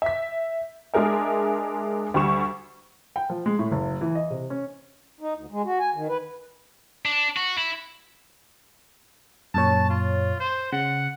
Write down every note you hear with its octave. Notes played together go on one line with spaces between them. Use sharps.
E5 B6
G#3 D4 G#4 A#4 E5
D2 G3 C#6 E7
G5
F3
G#3
A2
F#1
E3
D#5
C3
C#4
D#4
D2
G#3
F#4
G#5
D#3
B4
D4
F#4
E4
F#2 A#2 C#5 A5
F4
C5
C#3 F#5